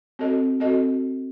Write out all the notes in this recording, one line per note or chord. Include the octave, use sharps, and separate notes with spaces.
C4 F#4 A4 D#5
C4 F#4 A4 D#5